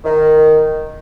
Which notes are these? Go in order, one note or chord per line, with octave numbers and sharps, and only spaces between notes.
D#3